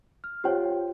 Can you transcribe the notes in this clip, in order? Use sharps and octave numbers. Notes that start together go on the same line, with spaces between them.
F6
F4 G4 C5 C#5 G5